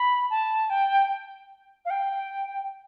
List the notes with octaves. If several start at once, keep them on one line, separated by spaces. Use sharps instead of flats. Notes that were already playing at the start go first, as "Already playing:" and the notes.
Already playing: B5
A5
G5
F5
G5